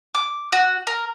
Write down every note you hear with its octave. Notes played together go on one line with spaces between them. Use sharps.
D6
F#4
A#4